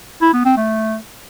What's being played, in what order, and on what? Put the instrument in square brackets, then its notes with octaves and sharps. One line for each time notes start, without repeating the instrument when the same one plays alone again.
[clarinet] E4
B3
C4
A3